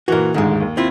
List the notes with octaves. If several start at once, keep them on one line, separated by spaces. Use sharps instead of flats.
A#2 E3 F#4 A#4
D#1 D2 G#2 D#3 G#3
D#2
C4 E4 F4